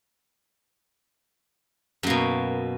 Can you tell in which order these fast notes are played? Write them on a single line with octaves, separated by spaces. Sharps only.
F#2 A#3 B2